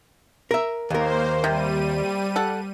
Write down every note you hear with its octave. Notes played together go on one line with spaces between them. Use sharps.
A#4 E5
D#2 A#3 A#4 C5
C3 G3 D#7
A4 F#5